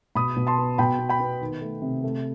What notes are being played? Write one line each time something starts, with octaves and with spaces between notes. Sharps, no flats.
B2 B5 D#6
B2
A5 C6
B3
B2 G5 B5
B3
G5 B5
B3
D#3
A3
C3
A3